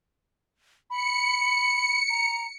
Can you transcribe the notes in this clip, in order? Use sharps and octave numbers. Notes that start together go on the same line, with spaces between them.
B5 C#7
A#5